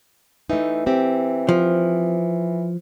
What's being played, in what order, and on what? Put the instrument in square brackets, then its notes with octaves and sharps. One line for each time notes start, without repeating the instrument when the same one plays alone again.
[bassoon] E3 [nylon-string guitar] A3 D#4
[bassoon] E3 [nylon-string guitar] C4 G4
[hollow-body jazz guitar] F3